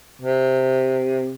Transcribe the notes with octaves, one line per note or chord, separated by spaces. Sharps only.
C3